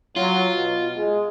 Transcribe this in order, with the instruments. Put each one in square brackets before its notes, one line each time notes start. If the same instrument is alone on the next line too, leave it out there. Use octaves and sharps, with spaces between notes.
[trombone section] F#3 [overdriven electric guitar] F4
[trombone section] B2
G#3